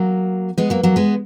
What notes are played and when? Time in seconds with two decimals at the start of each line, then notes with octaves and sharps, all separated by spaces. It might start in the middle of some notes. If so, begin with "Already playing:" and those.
Already playing: F#3 A#3
0.58 G#3 B3
0.70 F#3 A#3
0.83 F#3 A#3
0.96 G#3 B3